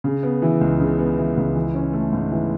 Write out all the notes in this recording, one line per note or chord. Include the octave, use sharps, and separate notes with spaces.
C#3
B3
E3
C#2
C#3
B3
E3
C#2
E3
C#4
A3
G#2
E3